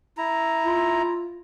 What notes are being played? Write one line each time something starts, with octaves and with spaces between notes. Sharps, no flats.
E4 A#5
F4